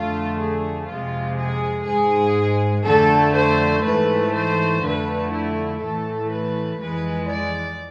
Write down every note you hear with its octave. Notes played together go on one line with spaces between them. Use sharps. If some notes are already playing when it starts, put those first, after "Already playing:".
Already playing: F2 D3 A3 F4
G#4
F2 C3 G#3 F4
G#4
G#2 G#3 G#4
F2 D3 A3 A4
C5
G#2 E3 A3 B4
C5
F2 D3 A3 B4
E4
A2 E3 A3 A4
B4
F2 E3 G#3 B4
D5